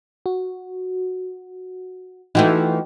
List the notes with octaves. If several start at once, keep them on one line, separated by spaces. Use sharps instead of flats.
F#4
E3 F3 A3 D#4 F#4 G5